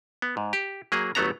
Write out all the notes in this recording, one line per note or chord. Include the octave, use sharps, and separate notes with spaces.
B3
G#2
G4
F#3 A#3 G#4
G1 F#3 A3 B3 A4 A#5